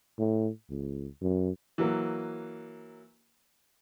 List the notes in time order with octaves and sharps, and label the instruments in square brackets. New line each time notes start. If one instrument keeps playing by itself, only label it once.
[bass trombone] A2
C#2
F#2
[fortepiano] E3 F#3 A#3